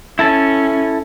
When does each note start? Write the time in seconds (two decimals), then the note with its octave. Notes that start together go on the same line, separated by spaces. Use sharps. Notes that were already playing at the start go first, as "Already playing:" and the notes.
0.19 C#4 E4 A4 A5